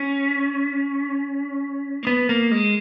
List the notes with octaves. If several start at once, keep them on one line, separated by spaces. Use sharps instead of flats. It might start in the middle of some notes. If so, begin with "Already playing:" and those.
Already playing: C#4
A#3
B3
A#3
G#3